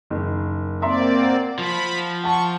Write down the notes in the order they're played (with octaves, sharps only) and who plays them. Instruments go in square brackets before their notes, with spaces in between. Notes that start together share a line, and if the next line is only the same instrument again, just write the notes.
[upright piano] F#1 D#3
[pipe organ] A#3 C4 D5 [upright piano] E5 A#5 C6
[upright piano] F#5
[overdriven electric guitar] F3 [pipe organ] B5
[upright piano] F#5 A5 [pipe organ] C#6